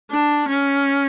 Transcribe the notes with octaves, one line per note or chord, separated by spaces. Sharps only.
D4
C#4